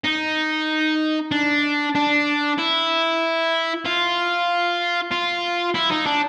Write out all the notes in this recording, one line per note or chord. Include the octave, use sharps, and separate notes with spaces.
D#4
D4
D4
E4
F4
F4
E4
D#4
D4